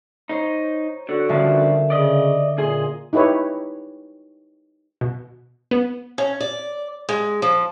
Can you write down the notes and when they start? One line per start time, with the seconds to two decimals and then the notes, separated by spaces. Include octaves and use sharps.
0.29 D#4 C5 C#5 C7
1.09 D3 F#4
1.29 G2 D3 F3 A#3 C#4 D4 E5 A5
1.90 C#3 D5 D#5
2.58 A#2 G#4 D#5 G#5 C6
3.13 D#4 E4 G4 B4 C#5
5.01 B2
5.71 B3
6.18 C#4
6.40 D5
7.09 G#3
7.42 F3